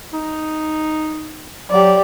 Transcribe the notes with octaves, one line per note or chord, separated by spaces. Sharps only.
D#4
F#3 G4 D5